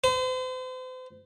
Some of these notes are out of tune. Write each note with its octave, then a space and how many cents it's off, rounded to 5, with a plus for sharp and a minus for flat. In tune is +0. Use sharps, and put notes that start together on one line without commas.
C5 -40